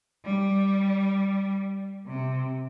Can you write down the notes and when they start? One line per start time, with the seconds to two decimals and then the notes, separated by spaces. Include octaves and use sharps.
0.24 G3
2.06 C3